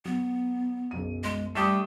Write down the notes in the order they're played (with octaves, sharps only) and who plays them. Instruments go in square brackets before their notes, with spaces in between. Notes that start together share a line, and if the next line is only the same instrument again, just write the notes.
[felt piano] F#3 [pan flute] B3
[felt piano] F#1 B1 D#7
[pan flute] G#3
[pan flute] G3 [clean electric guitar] A3 D4 G4 [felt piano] D#6 E7